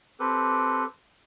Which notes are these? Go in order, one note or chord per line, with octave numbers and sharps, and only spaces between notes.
C4 G4 A4 B4